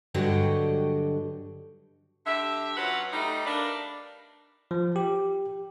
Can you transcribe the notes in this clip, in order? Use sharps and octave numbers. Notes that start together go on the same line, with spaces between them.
G2 D3 F#3 F#4 G4 D#5
D3 G4 E5
F#3 C#4 F4 B4 F#5
G3 A3 D#4
D4 A#4 B4 D5 F5
F3
G4